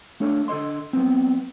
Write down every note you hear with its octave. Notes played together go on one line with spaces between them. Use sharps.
A3 D4 A4 C#5 F5
D3 A4 C5 D#5 C6
F#3 B3 C4